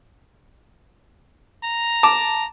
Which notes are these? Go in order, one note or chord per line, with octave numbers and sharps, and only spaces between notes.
A#5
A5 D6